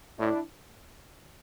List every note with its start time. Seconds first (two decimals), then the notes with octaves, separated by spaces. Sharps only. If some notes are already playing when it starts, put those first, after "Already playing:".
0.18 A2 D4 E4